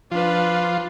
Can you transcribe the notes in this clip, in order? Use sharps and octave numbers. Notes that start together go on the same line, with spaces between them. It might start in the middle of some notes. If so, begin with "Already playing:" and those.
F3 D4 F4 B4